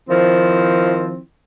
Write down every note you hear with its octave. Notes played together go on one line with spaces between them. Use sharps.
D#3 F3 C4 E4